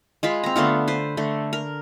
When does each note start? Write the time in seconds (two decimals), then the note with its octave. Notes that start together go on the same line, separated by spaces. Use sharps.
0.23 G#3 F4 B5
0.44 C4 A#5
0.56 D3 A3 B3 F4
0.88 B4 C5
1.17 D3 A3
1.53 A#4